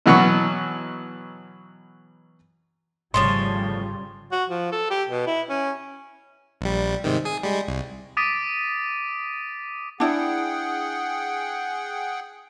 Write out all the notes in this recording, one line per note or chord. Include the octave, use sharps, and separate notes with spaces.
B2 E3 F#3 B3 F#5 C#6
G#1 A2 C#3 F3 G3 C#5 C6
F#4
F3
A4
G4
B2
E4
C#4
A#1 G3
G#2 C3 D#3
G#4 G#5
G3 G#3
C2
D6 D#6 A6 B6 D7 D#7
D4 E4 G#4 F#5 G5